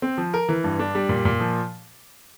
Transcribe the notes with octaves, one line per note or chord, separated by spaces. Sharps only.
C4
F3
A#4
E3
G2
D4
G3
A#2
A#2
F3